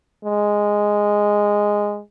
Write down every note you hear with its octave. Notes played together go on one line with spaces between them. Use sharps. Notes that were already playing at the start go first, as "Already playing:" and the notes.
G#3